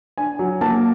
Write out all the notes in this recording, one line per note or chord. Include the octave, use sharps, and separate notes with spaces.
D4 G#5
F#3
A#3 A5